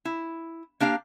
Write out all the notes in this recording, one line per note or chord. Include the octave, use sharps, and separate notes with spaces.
E4
A#3 D4 G4 F5